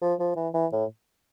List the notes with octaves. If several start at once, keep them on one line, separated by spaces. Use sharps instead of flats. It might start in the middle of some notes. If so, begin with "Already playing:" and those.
F3
F3
E3
E3
A2